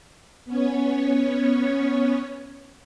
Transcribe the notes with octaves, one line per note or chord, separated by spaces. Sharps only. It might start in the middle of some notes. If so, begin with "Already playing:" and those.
B3 C#4 C#5